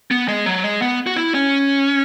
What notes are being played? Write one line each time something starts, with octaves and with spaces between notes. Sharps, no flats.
B3
G#3
F#3
G#3
B3
F#4
E4
C#4